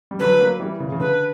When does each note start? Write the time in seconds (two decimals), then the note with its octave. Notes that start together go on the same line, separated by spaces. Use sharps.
0.11 G3
0.20 D3 F#3 B4
0.40 F#3 A#3
0.60 E3 G3
0.80 C#3 E3
0.92 C#3
1.00 D3 B4